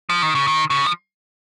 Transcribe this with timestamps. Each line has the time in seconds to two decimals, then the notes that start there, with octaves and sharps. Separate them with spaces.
0.10 F3
0.22 D#3
0.35 C#3
0.47 D#3
0.70 C#3
0.85 F3